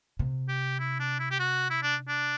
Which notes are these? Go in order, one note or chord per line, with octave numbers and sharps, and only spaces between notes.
C3
G4
E4
D4
E4
G4
F#4
E4
D4
D4